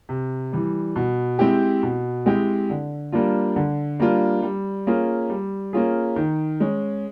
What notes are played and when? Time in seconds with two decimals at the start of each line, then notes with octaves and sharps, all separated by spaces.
0.09 C3
0.53 E3 G3
0.96 B2
1.39 G#3 C4 E4 G4
1.83 B2
2.26 G#3 C4 E4 G4
2.70 D3
3.12 G3 A#3 D4 F4
3.56 D3
3.99 G3 A#3 D4 F4
4.42 G3
4.87 A#3 C#4 F4 G#4
5.30 G3
5.73 A#3 C#4 F4 G#4
6.16 D#3
6.60 G#3 C#4